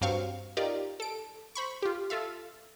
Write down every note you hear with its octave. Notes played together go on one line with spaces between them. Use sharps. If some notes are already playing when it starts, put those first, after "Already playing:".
G2 F#3 C4 F5 C#6
D#4 F4 G4 A#4 D5
A4 D7
C5 B5 C#6
F4 G4
F4 A4 E5 F5